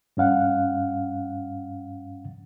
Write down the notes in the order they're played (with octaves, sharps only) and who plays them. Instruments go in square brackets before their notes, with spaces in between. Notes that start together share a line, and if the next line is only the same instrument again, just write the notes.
[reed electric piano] G2 C#4 F5 F#5